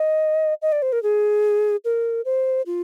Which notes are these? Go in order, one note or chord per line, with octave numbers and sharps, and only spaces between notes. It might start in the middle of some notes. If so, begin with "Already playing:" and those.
Already playing: D#5
D#5
D5
C5
A#4
G#4
A#4
C5
F4